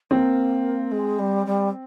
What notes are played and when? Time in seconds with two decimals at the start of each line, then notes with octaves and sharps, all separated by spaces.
0.11 A#3 C4
0.91 G#3
1.19 G3
1.46 G3